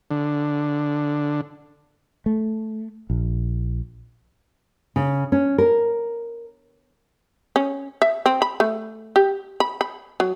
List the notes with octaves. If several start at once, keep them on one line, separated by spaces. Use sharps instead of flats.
D3
A3
A#1
C#3
C#4
A#4
C#4
E5
C4
B5
A3
G4
B5
B5
F#3